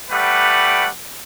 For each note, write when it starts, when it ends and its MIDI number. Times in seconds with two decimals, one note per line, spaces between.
0.11 0.88 55
0.11 0.88 57
0.11 0.88 67
0.11 0.88 71
0.11 0.88 74
0.11 0.88 78